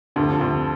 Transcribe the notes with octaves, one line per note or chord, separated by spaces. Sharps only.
D2 G2
F2
D2 G2